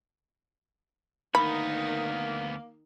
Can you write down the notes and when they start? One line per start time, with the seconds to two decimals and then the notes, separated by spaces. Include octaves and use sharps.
1.35 D2 D#3 A#3 B3 D#4 B5